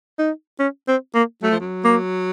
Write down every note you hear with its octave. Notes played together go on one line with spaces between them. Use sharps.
D#4
C#4
C4
A#3
F#3 A3
F3
F#3
A#3